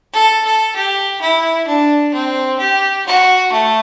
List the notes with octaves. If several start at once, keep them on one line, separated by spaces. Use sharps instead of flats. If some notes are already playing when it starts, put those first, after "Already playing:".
A4
A4
G4
E4
D4
C4
G4
F#4
A3